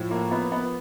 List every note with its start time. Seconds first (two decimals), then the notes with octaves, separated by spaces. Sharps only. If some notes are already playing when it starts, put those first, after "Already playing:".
Already playing: A2 F3
0.11 A#3
0.31 B3
0.52 B3